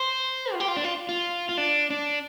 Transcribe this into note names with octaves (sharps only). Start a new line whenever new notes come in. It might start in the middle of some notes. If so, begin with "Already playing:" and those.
Already playing: C5
F4
G4
F4
D4
F4
F4
F4
D4
D4